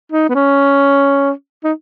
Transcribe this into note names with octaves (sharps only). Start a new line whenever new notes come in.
D#4
B3
C#4
D#4